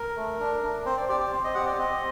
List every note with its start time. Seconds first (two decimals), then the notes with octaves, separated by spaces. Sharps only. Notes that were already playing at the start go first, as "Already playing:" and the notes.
Already playing: A#4
0.17 A3
0.40 D4
0.63 D4
0.85 C4 C5
0.97 D5
1.09 G4 D5
1.20 D5
1.32 C4 C5
1.44 D#5
1.55 G4 F#5
1.67 D5
1.78 C4 D#5